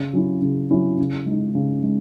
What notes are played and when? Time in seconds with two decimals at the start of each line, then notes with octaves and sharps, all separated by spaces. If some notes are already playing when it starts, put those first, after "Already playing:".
Already playing: C#3
0.13 F#3 C#4 E4
0.42 C#3
0.71 F#3 C#4 E4
0.98 C#3
1.26 G#3 D#4
1.55 C#3
1.83 G#3